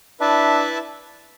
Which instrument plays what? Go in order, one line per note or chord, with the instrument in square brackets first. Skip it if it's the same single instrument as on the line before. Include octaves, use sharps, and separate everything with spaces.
[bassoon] D4 [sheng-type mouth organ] E4 B4 E5 A5